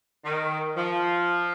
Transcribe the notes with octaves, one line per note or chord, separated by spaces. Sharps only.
D#3
F3